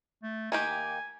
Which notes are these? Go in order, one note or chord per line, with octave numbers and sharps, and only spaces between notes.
A3
D#3 A#3 G4 G#5